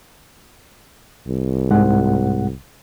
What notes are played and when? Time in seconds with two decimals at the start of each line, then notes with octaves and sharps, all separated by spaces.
1.28 C2
1.71 G#2 G#3 F#5